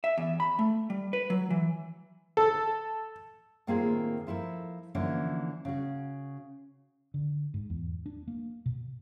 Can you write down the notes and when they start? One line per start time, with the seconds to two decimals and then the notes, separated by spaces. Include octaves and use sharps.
0.04 E5
0.18 E2
0.40 B5
0.59 A3
0.90 G3
1.13 B4
1.30 F#3
1.50 E3
2.37 A4
3.67 A2 D#3 A#3 C4 F4 G#4
4.27 F3 E4 A4 A#4
4.95 D3 E3 F3 A3 A#3 C#4
5.65 C#3 F#4
7.14 D3
7.54 G#2
7.70 E2
8.06 D4
8.28 A#3
8.66 B2